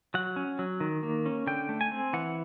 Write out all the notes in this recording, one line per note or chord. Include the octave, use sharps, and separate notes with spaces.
F#3 F#5
C#4
F#3
D#3
A#3
C#4
D3 G5
A3
G#5
C4
E3 F#5